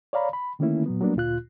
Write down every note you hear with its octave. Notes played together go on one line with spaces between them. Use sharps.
C#5 D5 F5 A#5 B5
B5
D3 D#3 A3 A#3 C#4 E4
A#2 F#3 B3
F#3 G3 A#3 B3 D4
D2 A#2 F4 F#6